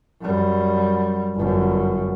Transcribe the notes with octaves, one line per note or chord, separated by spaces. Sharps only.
F#2 G3
G1 F#2